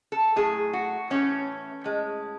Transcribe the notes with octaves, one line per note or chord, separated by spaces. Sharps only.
A4
A2 F#3 A3 G#4
F#4
A2 E3 A3 C#4
A2 G#3